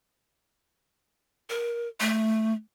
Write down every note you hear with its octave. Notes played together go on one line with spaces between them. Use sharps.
A#4
A3